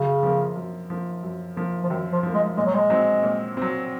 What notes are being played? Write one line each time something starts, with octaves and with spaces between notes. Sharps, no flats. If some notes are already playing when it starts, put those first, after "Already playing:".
Already playing: F#2 C#3
F3 A#3
F#2
F3 A#3
F#2
F3 A#3
F3
F#2 D#3
F3
F3 A#3
G#3
A#2 G#3
F#3
G#3
F#3 C4
A#2
F#3 C4